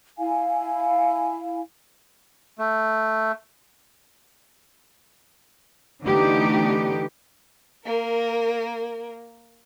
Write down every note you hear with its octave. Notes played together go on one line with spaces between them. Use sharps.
E4 F5 G#5
A3
D3 E3 A3 B3 D#4 G4
A#3 A#4